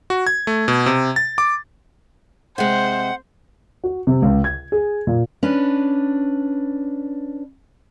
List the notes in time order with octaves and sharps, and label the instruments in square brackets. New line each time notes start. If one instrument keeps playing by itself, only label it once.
[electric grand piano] F#4
G#6
A3
B2
C3
A6
D6
[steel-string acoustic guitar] C3 G#3 [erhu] C5 [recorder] F#5
[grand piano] F#4
C3
C#2
G#6
G#4
A#2
[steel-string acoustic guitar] C#4 D4 B4